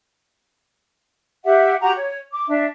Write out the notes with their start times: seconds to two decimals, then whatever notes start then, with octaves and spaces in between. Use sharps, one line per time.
1.44 G4 E5 F#5
1.81 F#4 G4 A#5
1.94 C#5
2.32 D6
2.47 D4 E5